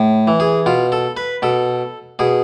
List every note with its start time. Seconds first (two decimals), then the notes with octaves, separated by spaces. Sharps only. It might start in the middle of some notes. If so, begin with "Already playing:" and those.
Already playing: A2
0.27 E3
0.40 G#4
0.66 B2 F4
0.92 A4
1.17 B4
1.42 B2 A4
2.19 B2 G#4